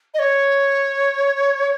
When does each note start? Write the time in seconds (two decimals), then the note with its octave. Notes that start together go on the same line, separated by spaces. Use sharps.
0.14 D#5
0.19 C#5